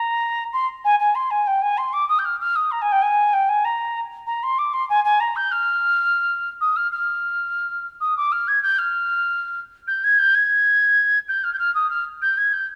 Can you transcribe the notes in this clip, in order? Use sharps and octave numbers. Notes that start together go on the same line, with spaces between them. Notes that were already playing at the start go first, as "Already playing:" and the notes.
Already playing: A#5
C6
G#5
G#5
C6
G#5
G5
G#5
C6
D6
D#6
G6
F6
F6
D#6
A#5
G#5
G5
G#5
G5
G#5
A#5
A#5
C6
D6
C6
G#5
G#5
A#5
G6
F6
D#6
F6
F6
D#6
D6
F6
G#6
G6
F6
G6
G#6
G6
G#6
G6
F6
G6
F6
D#6
F6
G6
G#6
G6